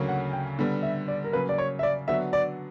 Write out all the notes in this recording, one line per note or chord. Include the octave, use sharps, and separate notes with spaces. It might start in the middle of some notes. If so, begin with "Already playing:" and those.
Already playing: D2 C#3 F#3 A#3 C#4
F#5
G5
D3 G3 B3
E5
D5
A#4
C#3 F#3 A#3 B4
D5
C#5
E5
D5
D3 F#3 B3 D4 F#4 E5
D5